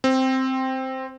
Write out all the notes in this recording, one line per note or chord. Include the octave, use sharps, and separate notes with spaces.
C4